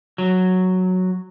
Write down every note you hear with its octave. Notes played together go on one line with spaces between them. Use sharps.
F#3